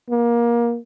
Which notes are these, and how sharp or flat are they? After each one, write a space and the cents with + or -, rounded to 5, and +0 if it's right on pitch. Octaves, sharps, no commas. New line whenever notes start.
A#3 +20